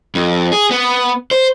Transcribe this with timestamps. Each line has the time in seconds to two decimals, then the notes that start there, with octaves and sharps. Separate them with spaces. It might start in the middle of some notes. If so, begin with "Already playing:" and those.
0.15 F2
0.52 G#4
0.71 B3
1.31 C5